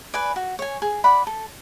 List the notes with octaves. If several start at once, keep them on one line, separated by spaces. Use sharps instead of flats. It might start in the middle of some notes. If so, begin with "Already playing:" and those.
B4 D5 G#5
F#4
C#5 G#5
G#4
D5 F#5 B5
A4